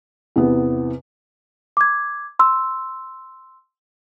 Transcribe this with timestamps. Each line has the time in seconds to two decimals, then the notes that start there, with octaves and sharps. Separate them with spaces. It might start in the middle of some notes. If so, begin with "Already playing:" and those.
0.36 E2 C3 E3 B3
1.77 D6 G#6
2.39 C6 E6